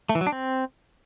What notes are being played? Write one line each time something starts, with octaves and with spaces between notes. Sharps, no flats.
A3
E3
F#3
D4
C4